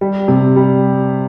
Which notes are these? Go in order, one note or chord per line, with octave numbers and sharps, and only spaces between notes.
G3
C3
G3